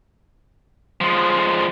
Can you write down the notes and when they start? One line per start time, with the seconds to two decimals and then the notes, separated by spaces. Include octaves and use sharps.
1.01 F3 G#3